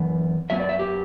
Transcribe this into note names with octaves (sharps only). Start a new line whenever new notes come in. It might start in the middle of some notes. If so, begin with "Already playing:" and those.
Already playing: F#2 E3 B3
F#2 F#3 B3 E5
D5
E5
G4